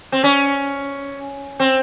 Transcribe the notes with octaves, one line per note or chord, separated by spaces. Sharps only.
C4
C#4
C4